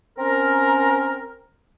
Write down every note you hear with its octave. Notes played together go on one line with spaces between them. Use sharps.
C4 C#4 A#4